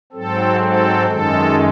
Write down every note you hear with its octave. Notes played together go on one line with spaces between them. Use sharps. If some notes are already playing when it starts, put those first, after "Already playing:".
G#2 F#3 C4 A4
A4
F#2 D#3 G#3 A4